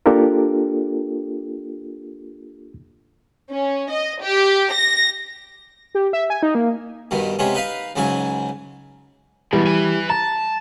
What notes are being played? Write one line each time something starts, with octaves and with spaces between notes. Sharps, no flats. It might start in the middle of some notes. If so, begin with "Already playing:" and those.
A#3 D4 F4 G4 A4 A#4
C#4
D#5
G4
A#6
G4
E5
G#5
D#4
A#3
G2 B2 D#3
C3 G#3 B3 C#4
D#4 B4 F5
C#2 G#2 C#3 F#3 G#5
B2 E3 G3 G#3
B4 G#5
A5 A#5